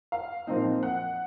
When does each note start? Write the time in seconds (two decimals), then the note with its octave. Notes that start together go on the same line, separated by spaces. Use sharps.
0.12 F5
0.47 A#2 F3 C4 D#4
0.83 F#5